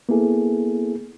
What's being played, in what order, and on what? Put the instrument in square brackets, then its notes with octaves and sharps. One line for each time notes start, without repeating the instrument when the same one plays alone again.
[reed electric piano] A#3 B3 E4 G#4 A4